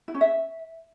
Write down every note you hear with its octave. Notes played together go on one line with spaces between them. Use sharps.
E4
C#4
E5